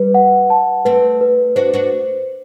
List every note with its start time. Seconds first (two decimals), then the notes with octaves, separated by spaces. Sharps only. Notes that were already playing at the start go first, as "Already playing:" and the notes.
Already playing: G3 B4
0.14 F#5
0.50 A5
0.85 A3 C4 B4
1.21 B4
1.56 D4 F#4 C5
1.74 D4 F#4